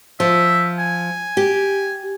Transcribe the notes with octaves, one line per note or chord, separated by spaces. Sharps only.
F3 E5
G#5
G4